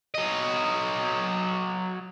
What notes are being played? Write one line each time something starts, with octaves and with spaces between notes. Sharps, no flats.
F#3 D#5